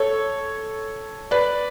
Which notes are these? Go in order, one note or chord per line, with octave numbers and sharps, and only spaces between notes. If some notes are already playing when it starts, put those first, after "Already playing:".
Already playing: A4 C#5
B4 D5